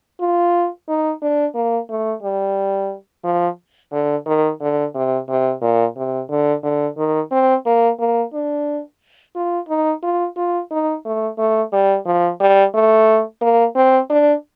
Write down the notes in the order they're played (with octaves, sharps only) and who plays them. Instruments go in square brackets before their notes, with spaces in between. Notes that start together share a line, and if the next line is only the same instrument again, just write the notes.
[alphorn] F4
D#4
D4
A#3
A3
G3
F3
D3
D#3
D3
C3
C3
A#2
C3
D3
D3
D#3
C4
A#3
A#3
D4
F4
D#4
F4
F4
D#4
A3
A3
G3
F3
G3
A3
A#3
C4
D4